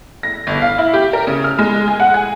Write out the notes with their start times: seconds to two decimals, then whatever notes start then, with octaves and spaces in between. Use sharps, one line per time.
0.23 A#6
0.47 G1
0.62 F5
0.78 E4
0.94 G4
1.13 A#4
1.27 C#3
1.44 F6
1.59 G#3
1.88 G#4
2.00 F#5
2.14 G#4